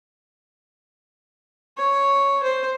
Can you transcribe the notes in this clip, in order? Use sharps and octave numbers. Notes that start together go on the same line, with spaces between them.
C#5
C5